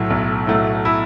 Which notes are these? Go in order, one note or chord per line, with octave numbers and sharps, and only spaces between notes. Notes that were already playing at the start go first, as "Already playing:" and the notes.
Already playing: B1 A2 F#3 A3
B1
A2 F#3 A3
E4